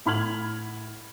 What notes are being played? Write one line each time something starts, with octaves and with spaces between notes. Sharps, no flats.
A2 F#5 B5 F6 G#6 F#7